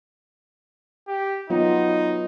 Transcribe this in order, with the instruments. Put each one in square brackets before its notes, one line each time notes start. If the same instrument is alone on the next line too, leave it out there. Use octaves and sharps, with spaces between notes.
[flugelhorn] G4
[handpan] F#3 B3 F4 [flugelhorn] D#4